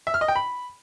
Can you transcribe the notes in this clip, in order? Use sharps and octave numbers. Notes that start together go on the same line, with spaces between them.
E5
F6
D#5
G5
B5